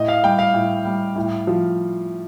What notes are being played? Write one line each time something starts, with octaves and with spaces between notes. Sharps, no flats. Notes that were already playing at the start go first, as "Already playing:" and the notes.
Already playing: A2 D#5
F5
G3 G5
F5
A2
G3
A2
F3